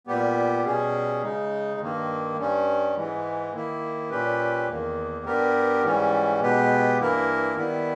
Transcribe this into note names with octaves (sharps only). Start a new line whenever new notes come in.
A#2 G3 B3 G4
B2 G3 C#4 G#4
C#3 G#3 D#4
G2 D#3 A#3
G2 G3 C#4
G#2 E3 G#3
D#3 A#3 E4
A#2 G3 C#4 G4 B4
E2 D#3 A#3
G2 G3 B3 G4 A#4
G#2 E3 G3 C#4
B2 G#3 B3 G4 B4
G2 E3 A#3 E4 A#4
D#3 G3 B3 E4